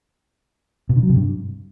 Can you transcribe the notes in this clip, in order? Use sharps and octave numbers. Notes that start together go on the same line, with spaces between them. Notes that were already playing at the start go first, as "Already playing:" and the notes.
B2
D3
F#3
C3
G2